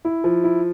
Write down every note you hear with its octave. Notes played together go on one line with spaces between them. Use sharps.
E4
F3
E4